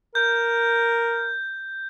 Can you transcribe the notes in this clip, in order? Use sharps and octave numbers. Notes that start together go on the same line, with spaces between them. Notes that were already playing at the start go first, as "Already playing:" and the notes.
A#4 G6